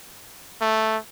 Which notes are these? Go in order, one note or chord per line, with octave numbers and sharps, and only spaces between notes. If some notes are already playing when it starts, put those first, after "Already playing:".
A3